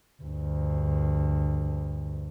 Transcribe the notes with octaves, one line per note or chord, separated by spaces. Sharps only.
D2 G2